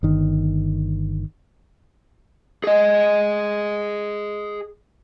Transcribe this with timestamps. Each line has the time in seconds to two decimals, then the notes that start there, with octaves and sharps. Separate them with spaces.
0.03 G1 D#3
2.64 G#4 D#5